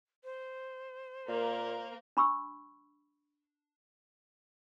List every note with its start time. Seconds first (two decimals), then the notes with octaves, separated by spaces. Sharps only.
0.24 C5
1.28 A#2 A#3 A#4
2.17 D4 B5 C#6 E6